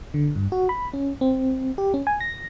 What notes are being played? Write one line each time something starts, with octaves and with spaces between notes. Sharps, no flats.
D3
G2
F#4
B5
C#4
C4
G4
C#4
G#5
A#6